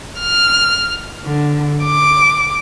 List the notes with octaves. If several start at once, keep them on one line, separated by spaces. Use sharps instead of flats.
F6
D3
D6